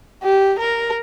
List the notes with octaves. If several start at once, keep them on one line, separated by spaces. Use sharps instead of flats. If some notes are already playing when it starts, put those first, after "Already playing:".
G4
A#4